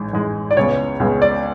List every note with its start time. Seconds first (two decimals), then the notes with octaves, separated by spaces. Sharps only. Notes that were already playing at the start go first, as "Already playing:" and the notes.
Already playing: A1 G#2 G#3
0.13 A1 G#2 G#3
0.51 D5
0.57 C#2 C#3 G#3 B3 C#5
1.00 C#2 C#3 G#3 B3
1.22 D5